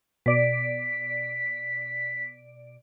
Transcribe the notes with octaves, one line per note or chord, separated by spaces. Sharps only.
B2 D5 B6 D7